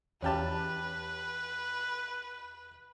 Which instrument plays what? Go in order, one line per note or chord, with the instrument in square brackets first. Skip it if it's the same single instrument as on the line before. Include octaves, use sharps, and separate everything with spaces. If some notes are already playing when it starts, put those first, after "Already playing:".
[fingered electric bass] E2 [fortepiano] C#4 G4 A5 [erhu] B4